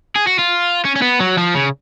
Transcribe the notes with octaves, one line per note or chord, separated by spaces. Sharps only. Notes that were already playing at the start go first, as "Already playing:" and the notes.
G#4
F#4
F4
C#4
C#4
B3
F#3
F3
C#3